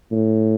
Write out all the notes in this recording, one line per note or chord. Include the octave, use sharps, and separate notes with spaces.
A2